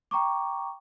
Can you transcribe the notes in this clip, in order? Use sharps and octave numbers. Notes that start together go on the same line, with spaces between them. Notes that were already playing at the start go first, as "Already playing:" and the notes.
G5 A#5 C#6 D6